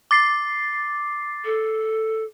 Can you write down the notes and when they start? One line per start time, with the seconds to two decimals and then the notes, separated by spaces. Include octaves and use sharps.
0.11 D6 A6 C7
1.45 A4